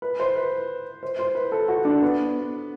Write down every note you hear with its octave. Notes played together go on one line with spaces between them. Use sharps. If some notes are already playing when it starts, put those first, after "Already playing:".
B4
C5
B4
C5
C5
B4
A4
F#4
D4
B3